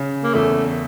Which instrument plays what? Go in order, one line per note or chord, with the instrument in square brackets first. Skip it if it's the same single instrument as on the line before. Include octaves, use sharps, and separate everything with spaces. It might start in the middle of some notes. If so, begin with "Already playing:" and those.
Already playing: [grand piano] C#3
[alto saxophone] A#3
[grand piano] E2 [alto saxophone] A3